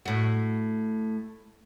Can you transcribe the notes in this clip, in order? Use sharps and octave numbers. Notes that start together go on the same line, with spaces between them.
A2 F#4